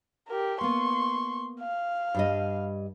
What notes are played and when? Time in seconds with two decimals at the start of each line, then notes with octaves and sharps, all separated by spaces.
0.28 G4 A#4
0.61 A#3 B3 C6 C#6
1.61 F5
2.15 G2 G3 D#5